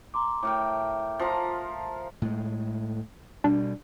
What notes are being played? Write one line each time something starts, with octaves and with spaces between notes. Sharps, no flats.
A#5 C6 D6
A2 A#4 G5 D6
F3 F4 A#5
A2 G#3
B2 G3 D4